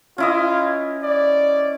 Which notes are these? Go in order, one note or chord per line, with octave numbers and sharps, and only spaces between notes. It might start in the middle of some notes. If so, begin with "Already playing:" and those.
C#4 E4 F4 D#5
D5